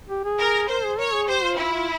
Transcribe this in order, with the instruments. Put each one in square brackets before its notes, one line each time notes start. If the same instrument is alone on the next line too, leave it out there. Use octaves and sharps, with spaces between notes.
[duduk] G4
G#4
[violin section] A#4
[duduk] A#4 [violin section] C5
[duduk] G#4
[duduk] A#4 [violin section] C#5
[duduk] G#4
[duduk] G4 [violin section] C5
[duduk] F4
[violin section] E4 [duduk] F4
[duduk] F4